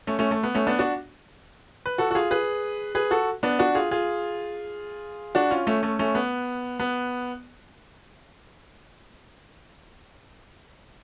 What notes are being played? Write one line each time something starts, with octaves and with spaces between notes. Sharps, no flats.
A3 C#4
A3 C#4
A3
B3
A3 C#4
B3 D4
D4 F#4
B4
F#4 A4
F#4
F4 G#4
G#4 B4
G#4 B4
F#4 A4
B3 D4
D4 F#4
F4 G#4
F4 G#4
D4 F#4
C#4 F4
A3 C#4
A3 C#4
A3 C#4
B3
B3